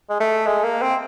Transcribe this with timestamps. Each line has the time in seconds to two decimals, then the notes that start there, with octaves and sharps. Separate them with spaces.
0.10 G#3
0.20 A3
0.47 G#3
0.64 A#3
0.82 C4